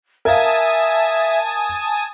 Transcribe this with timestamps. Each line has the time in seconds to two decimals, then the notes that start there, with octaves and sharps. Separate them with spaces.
0.25 A#4 E5 F5 G#5 A5 D#6